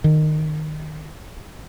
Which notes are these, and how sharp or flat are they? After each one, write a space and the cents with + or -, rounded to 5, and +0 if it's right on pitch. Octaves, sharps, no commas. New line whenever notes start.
D#3 -15